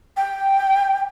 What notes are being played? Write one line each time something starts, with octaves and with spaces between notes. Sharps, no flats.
G5